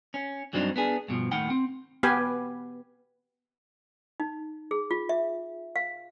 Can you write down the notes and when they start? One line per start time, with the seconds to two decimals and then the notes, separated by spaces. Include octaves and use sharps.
0.14 C#4
0.53 G2 F#3 C4 D4 D#4
0.76 B3 D4 G#4
1.08 G2 B2 F3
1.32 D#2 A2 D#3 F#5 G5
1.50 C4
2.03 B3 G4 B4 G5 G#5
4.20 D#4
4.71 G#4
4.91 F4
5.09 E5
5.76 F5